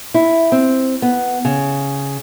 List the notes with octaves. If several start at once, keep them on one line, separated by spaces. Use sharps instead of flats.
E4
C4
B3
C#3